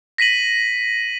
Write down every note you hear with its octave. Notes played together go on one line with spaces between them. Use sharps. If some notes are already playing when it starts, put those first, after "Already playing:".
A#6 B6 D#7 F#7